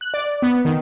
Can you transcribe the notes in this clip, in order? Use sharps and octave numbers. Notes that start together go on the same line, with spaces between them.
F#6
D5
B3
D#3